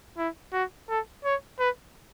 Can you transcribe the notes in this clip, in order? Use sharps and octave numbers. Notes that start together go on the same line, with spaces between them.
E4
F#4
A4
C#5
B4